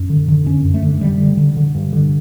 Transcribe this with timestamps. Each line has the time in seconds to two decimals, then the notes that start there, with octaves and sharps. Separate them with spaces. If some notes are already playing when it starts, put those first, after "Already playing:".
Already playing: F#2
0.10 D3
0.28 D3
0.46 F#2 C#4
0.65 F#2
0.74 A3
0.83 D3
1.01 D3 G3
1.20 D3
1.37 D3
1.57 D3
1.75 G2
1.93 D3